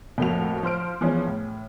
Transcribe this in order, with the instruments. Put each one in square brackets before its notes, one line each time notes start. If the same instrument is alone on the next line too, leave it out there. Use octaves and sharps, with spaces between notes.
[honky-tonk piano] F2 A2 A3 A#3 F#4 F7
F3 C5 F6 D7
E3 F3 B3 C#4 G#4
A2